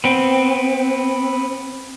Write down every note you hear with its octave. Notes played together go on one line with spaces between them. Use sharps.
B3 C4